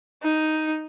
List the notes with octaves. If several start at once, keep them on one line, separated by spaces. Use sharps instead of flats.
D#4